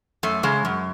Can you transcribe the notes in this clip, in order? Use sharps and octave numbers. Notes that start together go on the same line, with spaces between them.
F#2 A3
C#3 G#3
F#2